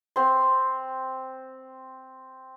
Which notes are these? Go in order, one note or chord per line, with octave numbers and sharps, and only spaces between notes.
C4 C6